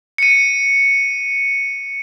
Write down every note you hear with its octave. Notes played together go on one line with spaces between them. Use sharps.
C#7 D#7